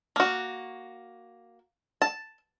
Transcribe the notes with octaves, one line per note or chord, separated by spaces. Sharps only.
A#3 F#4
A5